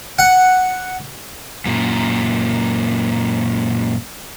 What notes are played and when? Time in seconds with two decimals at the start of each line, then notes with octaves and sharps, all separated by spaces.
0.19 F#5
1.66 F#2 A#2